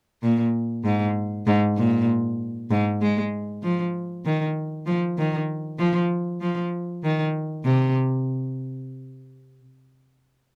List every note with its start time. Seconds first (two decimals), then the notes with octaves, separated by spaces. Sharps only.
0.23 A#2
0.84 G#2
1.47 G#2
1.77 A#2
2.71 G#2
3.02 G#3
3.63 F3
4.25 D#3
4.86 F3
5.18 D#3
5.79 F3
6.41 F3
7.04 D#3
7.65 C3